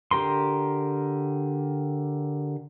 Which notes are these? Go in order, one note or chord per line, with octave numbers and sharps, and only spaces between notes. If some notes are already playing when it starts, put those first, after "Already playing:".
D3 G4 A#4 C6